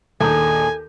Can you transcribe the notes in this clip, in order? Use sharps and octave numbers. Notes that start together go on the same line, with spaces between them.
D#2 A#2 D4 G#4 A4 G#5 A#5 G6